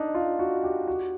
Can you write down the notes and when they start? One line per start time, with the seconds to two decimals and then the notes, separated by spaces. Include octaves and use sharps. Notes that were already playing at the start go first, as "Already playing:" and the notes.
Already playing: D4 D#4
0.15 F4
0.39 F#4
0.63 G4
0.88 F#4